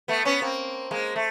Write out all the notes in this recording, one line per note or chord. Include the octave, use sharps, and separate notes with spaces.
A3 B3
B3 C#4
A#3 C4
G#3 A#3
A3